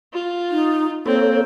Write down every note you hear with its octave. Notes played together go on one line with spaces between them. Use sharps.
F4
D#4
A#3 C4 A4 C#5